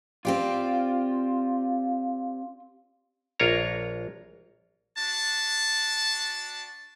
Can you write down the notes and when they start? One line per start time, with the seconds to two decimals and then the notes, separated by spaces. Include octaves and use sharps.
0.25 C4 F4 G4 D5
3.40 A#1 F4 A#4 C#5 A#5
4.98 D4 F#4 A5